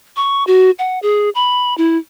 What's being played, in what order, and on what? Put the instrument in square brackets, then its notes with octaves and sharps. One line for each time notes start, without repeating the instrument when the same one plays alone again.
[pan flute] C#6
F#4
F#5
G#4
B5
E4